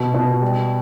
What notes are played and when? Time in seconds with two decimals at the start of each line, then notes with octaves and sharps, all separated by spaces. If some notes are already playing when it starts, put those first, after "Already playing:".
Already playing: B2
0.14 B2
0.42 G3